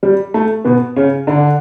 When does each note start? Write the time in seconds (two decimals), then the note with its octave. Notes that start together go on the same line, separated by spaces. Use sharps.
0.03 G3
0.34 A3
0.65 B2 B3
0.96 C#3 C#4
1.27 D3 D4